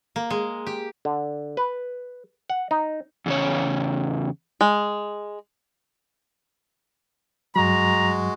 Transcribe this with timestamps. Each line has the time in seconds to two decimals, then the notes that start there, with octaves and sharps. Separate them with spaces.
0.16 A#3
0.30 G#3
0.67 G4
1.05 D3
1.57 B4
2.50 F#5
2.71 D#4
3.26 E2 C#3 C#5
4.61 G#3
7.56 G2 F#3 G#3 F#4 A#5